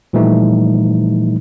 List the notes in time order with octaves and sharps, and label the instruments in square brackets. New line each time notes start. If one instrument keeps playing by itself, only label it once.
[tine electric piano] A#2 E3 F3 G3 A3 D#4